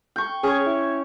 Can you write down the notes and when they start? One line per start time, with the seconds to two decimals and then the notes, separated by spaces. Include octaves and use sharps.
0.16 G5 C#6
0.43 C#4 G#4 C#5
0.66 E4